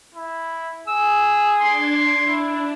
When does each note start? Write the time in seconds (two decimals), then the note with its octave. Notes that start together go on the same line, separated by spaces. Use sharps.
0.15 E4
0.87 G#4 E6
1.60 D4 C6 D6 G#6
2.28 D4 E4